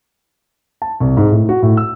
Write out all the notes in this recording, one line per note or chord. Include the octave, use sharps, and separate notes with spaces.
A5
C2
G#2
A2
F#4
A2
E6